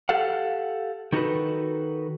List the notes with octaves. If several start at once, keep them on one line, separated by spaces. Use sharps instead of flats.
G4 A4 F5 F#5
D#3 D#4 F#4 G4 A4 B4